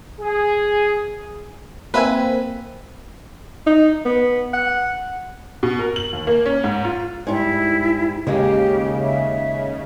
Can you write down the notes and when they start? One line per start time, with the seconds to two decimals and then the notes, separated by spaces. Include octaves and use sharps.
0.20 G#4
1.94 A#3 C4 B4 E5 G#5
3.67 D#4
4.05 B3
4.53 F#5
5.63 B2
5.79 A#4
5.96 F#7
6.13 D#2
6.27 A#3
6.46 C#4
6.64 G#2
6.85 F4
7.27 G#2 G3 E4
8.27 D#2 C#3 G#3 A#3 G4
9.01 E5